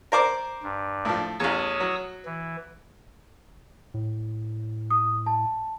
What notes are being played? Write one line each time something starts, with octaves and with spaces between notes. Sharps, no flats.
A#4 C5 D5
G2
A2 F3
A1 E2 C#5 D#6 E6
F#3
E3
A2
D#6
A5